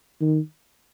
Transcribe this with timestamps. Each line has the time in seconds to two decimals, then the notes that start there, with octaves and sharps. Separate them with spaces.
0.21 D#3